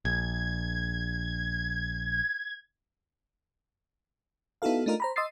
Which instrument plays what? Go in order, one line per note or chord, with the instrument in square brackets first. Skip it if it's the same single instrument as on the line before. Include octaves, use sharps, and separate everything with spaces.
[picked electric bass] A#1 [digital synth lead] G#6
[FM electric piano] B3 D#4 E4 F#4 A4 F5
A3 D4 D#4 F4 A#4
C5 A#5 B5
D#5 C6 D#6 E6 A6 C7